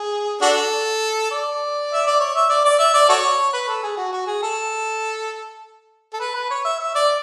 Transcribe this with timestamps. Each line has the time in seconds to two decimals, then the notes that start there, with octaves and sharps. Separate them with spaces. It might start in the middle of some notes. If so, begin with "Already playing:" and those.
Already playing: G#4
0.41 D4 F#4 A4
1.31 D5
1.93 E5
2.07 D5
2.20 C#5
2.34 E5
2.50 D5
2.65 D5
2.79 E5
2.94 D5
3.09 F#4 A4 C#5
3.53 B4
3.68 A4
3.83 G#4
3.97 F#4
4.13 F#4
4.27 G#4
4.43 A4
6.14 A4
6.20 B4
6.35 B4
6.51 C#5
6.65 E5
6.80 E5
6.95 D5